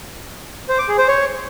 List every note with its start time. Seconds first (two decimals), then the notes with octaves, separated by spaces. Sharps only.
0.69 C5
0.78 D6
0.88 G#4
0.98 C5
1.08 C#5